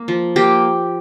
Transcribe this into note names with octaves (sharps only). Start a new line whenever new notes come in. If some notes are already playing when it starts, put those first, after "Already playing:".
Already playing: A#3
F3
A#3 G4